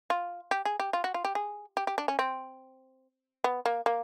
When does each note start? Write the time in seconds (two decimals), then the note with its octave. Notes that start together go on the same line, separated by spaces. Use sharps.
0.10 F4
0.51 G4
0.65 G#4
0.80 G4
0.93 F4
1.04 F#4
1.14 F4
1.25 G4
1.35 G#4
1.77 G4
1.87 G4
1.98 D4
2.08 C#4
2.19 C4
3.44 B3
3.66 A#3
3.86 A#3